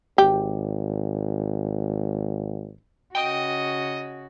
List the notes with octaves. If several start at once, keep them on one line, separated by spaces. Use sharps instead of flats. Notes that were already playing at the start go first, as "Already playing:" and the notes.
G#1 G4
C#3 F#4 D#5 G5